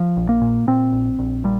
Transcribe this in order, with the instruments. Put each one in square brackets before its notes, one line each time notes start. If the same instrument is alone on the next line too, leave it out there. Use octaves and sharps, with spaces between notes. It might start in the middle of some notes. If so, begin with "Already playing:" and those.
Already playing: [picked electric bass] F3
A#1
A#3
A#2
A#2 C4
A#1
A#1
A#2 G3